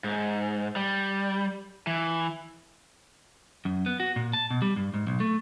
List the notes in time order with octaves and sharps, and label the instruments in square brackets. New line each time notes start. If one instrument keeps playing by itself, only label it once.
[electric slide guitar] G#2
G3
E3
[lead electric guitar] F#2
B3
F#4
A#2
A5
B2
G3
G2
G#2
B1
A3